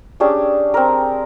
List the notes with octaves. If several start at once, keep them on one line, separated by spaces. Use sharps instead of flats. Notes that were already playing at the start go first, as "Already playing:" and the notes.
C#4 D4 G4 G#4
C4 A#4